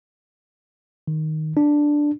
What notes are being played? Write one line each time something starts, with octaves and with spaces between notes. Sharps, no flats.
D#3
D4